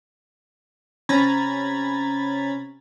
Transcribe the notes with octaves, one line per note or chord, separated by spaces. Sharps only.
C3 C#4 A#5 B5 G#6 A6